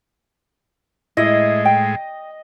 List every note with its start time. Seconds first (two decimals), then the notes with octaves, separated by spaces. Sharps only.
1.17 A2 G#3 E4 D#5
1.65 G5